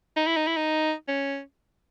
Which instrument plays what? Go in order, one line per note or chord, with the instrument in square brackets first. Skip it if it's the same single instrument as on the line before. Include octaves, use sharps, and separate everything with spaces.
[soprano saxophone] D#4
E4
D#4
E4
D#4
C#4